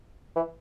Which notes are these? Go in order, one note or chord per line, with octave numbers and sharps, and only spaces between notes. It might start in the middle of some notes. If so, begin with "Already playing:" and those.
E3